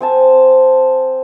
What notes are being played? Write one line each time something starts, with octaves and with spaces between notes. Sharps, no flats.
C4 G#5 A5